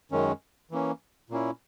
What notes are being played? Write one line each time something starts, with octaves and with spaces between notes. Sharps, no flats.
F#2 D#3 G#3 C#4
E3 A#3 C#4
A#2 A#3 C#4 E4